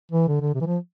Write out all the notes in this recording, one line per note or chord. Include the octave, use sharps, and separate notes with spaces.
E3
D3
D3
C3
E3
F3